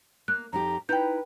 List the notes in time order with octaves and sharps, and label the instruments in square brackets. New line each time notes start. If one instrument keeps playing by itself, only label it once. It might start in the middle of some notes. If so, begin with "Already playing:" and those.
[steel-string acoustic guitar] A#3 [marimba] F#6
[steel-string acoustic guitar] F2 D#4 G4 [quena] A#5
[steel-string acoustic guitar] D#4 E4 A#5 [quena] B4 [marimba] G5 G6